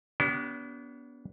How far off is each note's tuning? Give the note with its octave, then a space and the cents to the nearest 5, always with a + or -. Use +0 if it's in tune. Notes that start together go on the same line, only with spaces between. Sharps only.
B3 -20 D4 -45 G4 -40